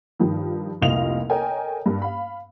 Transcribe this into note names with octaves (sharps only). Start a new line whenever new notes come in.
G2 D#3 F3
F1 C2 A#2 D#5 F5 F7
A4 A#4 C#5 D#5 G5 G#5
G2 A#3
F5 B5